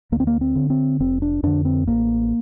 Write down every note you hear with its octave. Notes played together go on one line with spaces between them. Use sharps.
D2 A#3
C4
A#3
C4
D3
C4
F1 C4
D4
F2 D3 D4
C4
A1 A#3